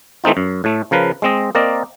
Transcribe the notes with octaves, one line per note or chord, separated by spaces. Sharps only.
E3 A3 C4 D#4 F4
F#2
A2 A3
C#3 F3 A#4 B4
G#3 C4 D#5
A#3 C4 A#4 D5 D#5